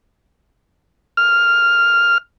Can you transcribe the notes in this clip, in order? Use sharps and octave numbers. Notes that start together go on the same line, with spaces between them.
F6